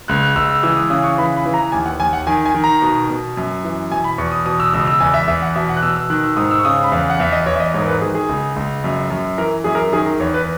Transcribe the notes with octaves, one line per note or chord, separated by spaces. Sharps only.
C#2 F#6
F#6
C#2 E6
E6
E3 E6
D#6
C#3 D#6
C#6
E3 B5
B5
E3
A#5
D#2 G#5
F#5
D#2 G#5
F#5
D#3 G#5
G#5
D#3
A#5
B2
B2
F#2
E3
B2 G#5
B5
E2 C#6
D#6
B2 D#6
E6
C#2 E6
E6
E2 G#5
E5
E2 E5
F#5
B2 E5
F#5
F#6
B2 E6
E6
D#3 F#6
E6
G#2 D#6
E6
C#6
C#3 D#6
B5
E2
F#5
E2 E5
D#5
E2 C#5
E5
D#5
G#2 C#5
A#4
B4
D#3 G#4
G#4
C#2
C#2
F#2
F#2
E3 A#4
F#2 G#4
A#4
D#3 G#4
A#4
E2 C#5
B4